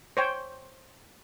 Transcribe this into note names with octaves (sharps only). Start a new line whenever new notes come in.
C5 C#5 G5